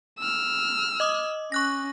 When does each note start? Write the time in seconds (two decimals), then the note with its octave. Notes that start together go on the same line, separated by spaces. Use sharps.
0.19 E6 F6
1.00 D#5 D6 D#6
1.52 C#4 C#6 F#6 A#6